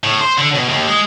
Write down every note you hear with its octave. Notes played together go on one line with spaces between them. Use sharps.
A2
C5
D3
B2
D#2
G#3